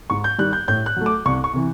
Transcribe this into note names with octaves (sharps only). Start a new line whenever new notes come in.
G#2 C#6
G6
D#3 G3 F#6
G6
A2 G6
F#6
F#3 A3
D6
C2 C#6
C#6
C3 E3